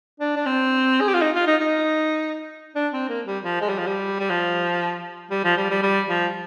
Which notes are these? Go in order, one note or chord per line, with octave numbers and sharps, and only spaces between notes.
D4
D4
C4
G#4
G4
F4
D#4
F4
D#4
D#4
D4
C4
A#3
G3
F3
G#3
G3
F3
G3
G3
F3
G3
F3
G3
G3
G3
F3